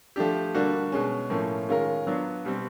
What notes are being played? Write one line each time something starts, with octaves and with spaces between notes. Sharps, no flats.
F3 A3 D4 G4
D3 G3 A#3 D4 F#4
B2 G#3 C#4
A2 F3 A#3 C#4
D#3 G#3 C#4 F4 A#4
F#3 B3 D4 F4
B2 G3 C4